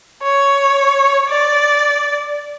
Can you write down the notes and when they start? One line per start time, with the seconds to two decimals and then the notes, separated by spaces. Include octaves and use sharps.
0.23 C#5
1.28 D5